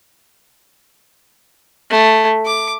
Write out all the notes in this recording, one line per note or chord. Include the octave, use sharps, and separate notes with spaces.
A3
D6